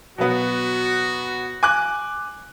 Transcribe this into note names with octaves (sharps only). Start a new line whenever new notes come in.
B2 F#3 B3 F#4
G#5 D6 F#6